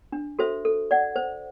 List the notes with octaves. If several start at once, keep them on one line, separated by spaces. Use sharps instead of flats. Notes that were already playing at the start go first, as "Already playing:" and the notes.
D4
F#4 A4 C5 E5
A4
D5 F#5
C5